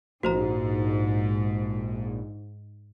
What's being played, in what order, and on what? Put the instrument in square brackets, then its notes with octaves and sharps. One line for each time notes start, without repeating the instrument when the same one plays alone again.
[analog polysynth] A#1 [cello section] G#2 [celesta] F#4 C5 A#5